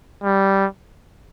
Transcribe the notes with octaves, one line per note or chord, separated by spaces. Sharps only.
G3